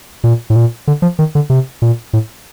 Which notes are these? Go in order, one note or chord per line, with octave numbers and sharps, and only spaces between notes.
A#2
A2
A#2
D3
F3
D#3
D3
C3
A#2
A2